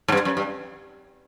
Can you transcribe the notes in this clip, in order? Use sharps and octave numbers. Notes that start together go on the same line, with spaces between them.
G#2
G2
F#2
G2